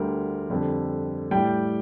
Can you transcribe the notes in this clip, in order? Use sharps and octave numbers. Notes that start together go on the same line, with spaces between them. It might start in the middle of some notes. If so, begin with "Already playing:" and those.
Already playing: D2 D3 G3 A#4
F2 D3 G3
A2 G3 G5